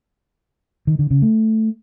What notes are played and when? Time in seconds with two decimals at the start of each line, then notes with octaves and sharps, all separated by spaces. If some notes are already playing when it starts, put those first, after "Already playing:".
0.87 D#3
0.99 D3
1.11 C#3
1.22 A3